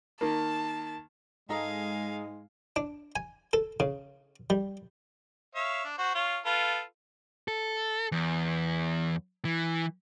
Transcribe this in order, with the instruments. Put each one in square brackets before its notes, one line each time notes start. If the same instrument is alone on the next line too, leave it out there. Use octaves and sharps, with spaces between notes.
[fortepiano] D#3 A#3 [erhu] A5
[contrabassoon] G#2 [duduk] G#3 [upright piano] A4 D#5 A#5 [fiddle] F5 G#5
[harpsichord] D4
G#5
A4
C#3
G3
[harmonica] C#5 E5 F5
D4
F#4 C5
F4 C#5
F4 A4 B4
[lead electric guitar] A4
E2
E3